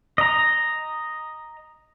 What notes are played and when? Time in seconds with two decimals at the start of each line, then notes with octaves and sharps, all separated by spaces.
0.18 D#5 A#5